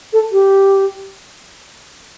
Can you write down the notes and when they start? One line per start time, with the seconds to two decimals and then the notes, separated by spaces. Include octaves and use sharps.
0.13 A4
0.32 G4